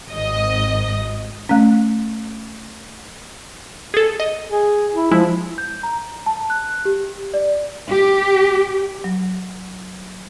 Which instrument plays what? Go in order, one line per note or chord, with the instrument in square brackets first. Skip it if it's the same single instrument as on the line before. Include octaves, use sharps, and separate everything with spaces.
[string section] G#1 D#5
[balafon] A3 C#4
[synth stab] G#4 A4
D#5
[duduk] G#4
E4
[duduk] F3 [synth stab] G#3 E4
[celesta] G6
A#5
A5
F#6
G4
D5
[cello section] G4
[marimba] F#3